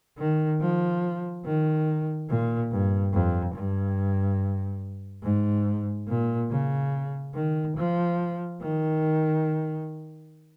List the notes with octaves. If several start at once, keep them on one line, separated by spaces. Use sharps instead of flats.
D#3
F3
D#3
A#2
G2
F2
G2
G#2
A#2
C#3
D#3
F3
D#3